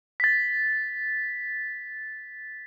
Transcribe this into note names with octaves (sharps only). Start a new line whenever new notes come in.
A6 B6